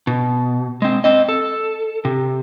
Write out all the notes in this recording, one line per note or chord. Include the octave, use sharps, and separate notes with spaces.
B2
G#3 C4
C4 D#5
A4
C3